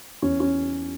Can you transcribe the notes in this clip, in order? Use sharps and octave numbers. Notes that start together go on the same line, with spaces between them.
E2 C#4
C#4